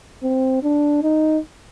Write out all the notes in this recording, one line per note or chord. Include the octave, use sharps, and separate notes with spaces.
C4
D4
D#4